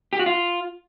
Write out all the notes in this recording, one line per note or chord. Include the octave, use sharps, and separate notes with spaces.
G4
F#4
F4